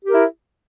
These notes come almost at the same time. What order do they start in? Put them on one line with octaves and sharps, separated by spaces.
G4 A#4 E4